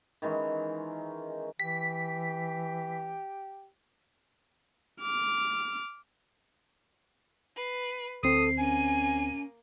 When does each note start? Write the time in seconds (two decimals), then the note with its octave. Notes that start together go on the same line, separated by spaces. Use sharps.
0.22 D#3 E3 G#3 C#4
1.60 E3 G4 B6
5.01 D6 F6
7.56 B4 C7
8.23 D2 C4 A4 D#6 C7
8.58 A#3 C#4 G#5 D#7